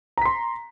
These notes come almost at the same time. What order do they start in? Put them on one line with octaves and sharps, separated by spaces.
A#5 B6 C6